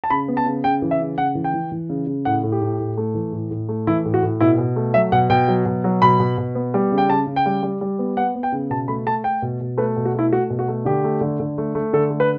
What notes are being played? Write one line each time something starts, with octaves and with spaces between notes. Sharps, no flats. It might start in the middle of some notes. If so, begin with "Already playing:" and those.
A5
C#3 B5
B3
A5
C#3
C#3 G5
E3
E5
C#3
C#3 F#5
E3
G5
E3
E3
C#3
C#3
A2 F#5
A2
G4
A2
A2
A3
E3
A2
A2
A3
E3 E4
A2
F#4
A2
B2 E4
B2
A3
F#3 E5
B2 F#5
B2 G5
F#3
B2
F#3
B2 B5
B2
B2
B3
G3
C#3
G5
C#3 A5
C#3
G5
G3
G3
G3
B3
B3 F#5
B3
G5
C#3
B2 A5
A3 B5
A3 A5
A3 G5
B2
B2
A3 B4
B2
F#4
A3 E4
A3 F#4
B2
F#4
A3
D3 G4
A3
D3
D3
A3
A3
D3 A4
A3
B4